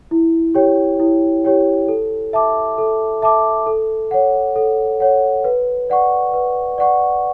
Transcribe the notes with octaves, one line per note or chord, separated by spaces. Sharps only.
E4
G4 C#5 G5
E4
G4 C#5 G5
A4
E5 A5 D6
A4
E5 A5 D6
A4
C#5 F#5
A4
C#5 F#5
B4
D5 F#5 C#6
B4
D5 F#5 C#6